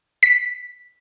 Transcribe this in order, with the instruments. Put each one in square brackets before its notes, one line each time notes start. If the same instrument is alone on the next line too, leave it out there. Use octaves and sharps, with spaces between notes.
[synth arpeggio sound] B6